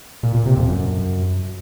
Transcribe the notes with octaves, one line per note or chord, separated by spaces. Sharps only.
A#2
A#2
C3
F2
F#2